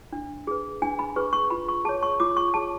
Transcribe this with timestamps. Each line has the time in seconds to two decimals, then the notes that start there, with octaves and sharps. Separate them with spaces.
0.13 D4
0.47 G#4 B4
0.82 D4 G#5
0.99 B5
1.16 G#4 B4 C#6
1.33 C#6
1.50 F4 B5
1.68 C#6
1.85 G#4 A5
1.89 C#5
2.03 C#6
2.20 F4 D6
2.37 C#6
2.54 G#4 C#5 A5